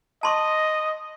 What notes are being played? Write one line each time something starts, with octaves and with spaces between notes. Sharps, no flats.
D#5 A5 C6 C#6